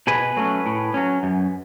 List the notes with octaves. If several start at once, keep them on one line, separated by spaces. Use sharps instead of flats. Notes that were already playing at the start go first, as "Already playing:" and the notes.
B2 G#4 B4
F#3 A3 C#4
A2
F#3 C#4
F#2